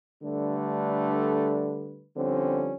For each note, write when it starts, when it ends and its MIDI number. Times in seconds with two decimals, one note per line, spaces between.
0.23 2.07 50
0.23 2.07 55
0.23 2.07 57
0.23 2.07 62
0.23 2.07 71
2.16 2.74 50
2.16 2.74 53
2.16 2.74 55
2.16 2.74 60
2.16 2.74 61